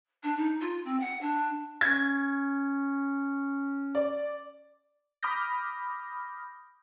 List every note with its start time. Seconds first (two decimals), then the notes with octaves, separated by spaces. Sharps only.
0.23 D4
0.37 D#4
0.60 F4
0.85 C4
1.00 F#5
1.21 D4
1.81 C#4 G#6
3.95 D5
5.23 B5 D6 D#6 F6 G6 A#6